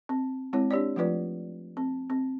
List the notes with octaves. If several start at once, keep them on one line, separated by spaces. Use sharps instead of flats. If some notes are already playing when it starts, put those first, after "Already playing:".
C4
G#3 C4 E4 C#5
D4 G4 C#5 D5
F3 A3 F4 B4 D5
C4
C4